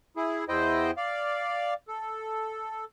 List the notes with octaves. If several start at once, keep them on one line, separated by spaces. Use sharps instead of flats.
E4 G#4
E2 E4 C5 D#5 G5
D5 F5
A4